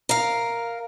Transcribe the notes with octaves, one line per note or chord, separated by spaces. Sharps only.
A#4 F5